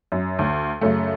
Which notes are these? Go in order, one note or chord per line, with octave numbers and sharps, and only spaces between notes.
F#2
D2
F#2 C#3 A3